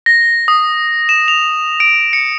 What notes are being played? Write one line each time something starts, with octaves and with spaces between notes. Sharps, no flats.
A#6
D#6
E7
F7
D7
C#7